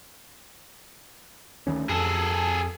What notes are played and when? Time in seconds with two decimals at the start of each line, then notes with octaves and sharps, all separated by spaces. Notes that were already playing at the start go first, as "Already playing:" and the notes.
1.67 D2 D#3 C#4
1.90 F2 G#4 A4